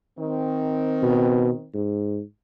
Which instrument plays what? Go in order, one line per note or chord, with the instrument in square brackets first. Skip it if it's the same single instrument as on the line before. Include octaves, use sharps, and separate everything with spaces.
[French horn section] D#3 C4
[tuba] B2
G#2